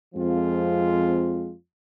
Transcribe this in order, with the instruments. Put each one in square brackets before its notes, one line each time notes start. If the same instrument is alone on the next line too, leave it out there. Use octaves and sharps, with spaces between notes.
[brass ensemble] F2 F3 G#3 C4 F4